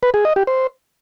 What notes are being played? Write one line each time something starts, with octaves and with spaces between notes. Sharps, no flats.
B4
G#4
D#5
G4
C5